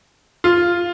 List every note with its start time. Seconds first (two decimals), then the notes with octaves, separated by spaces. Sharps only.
0.44 F4